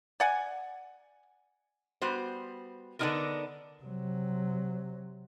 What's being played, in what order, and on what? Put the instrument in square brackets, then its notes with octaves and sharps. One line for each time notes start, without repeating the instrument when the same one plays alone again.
[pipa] D5 F#5 G#5
[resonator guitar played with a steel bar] G3 B3 F#4 C5
D3 B3 D4 D#4 F4 A#4
[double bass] C3 F#3